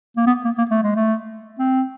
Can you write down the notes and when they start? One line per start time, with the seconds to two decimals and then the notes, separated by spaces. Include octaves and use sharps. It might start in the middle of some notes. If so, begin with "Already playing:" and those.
0.17 A#3
0.27 B3
0.45 A#3
0.58 A#3
0.70 A3
0.83 G#3
0.96 A3
1.59 C4